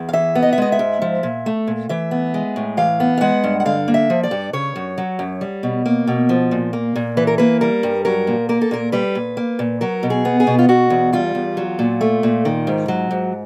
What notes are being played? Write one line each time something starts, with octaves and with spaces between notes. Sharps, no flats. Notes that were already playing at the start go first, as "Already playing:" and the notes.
Already playing: E2
F5
E3 E5
B3
D#5
E5
G#3 D#5
E5
G#2
F3
A#2
A3
A#2
E3 E5
B3
G#3
A2
E3 F5
B3
F5
G#3 F#5
G2
F#5
D3 F5
A#3
E5
F3
D5
G2
C#3 C#5
F#2
F#3
F#2
G3
B2
A#3
B2
F3
A#2
A#3
A#2
E3 B4
A#4
A#3 B4
G3 A#4
G2
F#3 A#4
A#2
A#3 A#4
A4
A#2 A#4
G3 B4
A#2
A#3
A#2
F#3 A#4
B2
G#4
B3
G#4
B2
F4
B2 F#4
E2
G3 F4
E2
F#3
A#2
A3
A#2
D#3
G#2
F#3
G#2